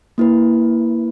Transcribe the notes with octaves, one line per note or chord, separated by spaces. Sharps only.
A#3 E4 B4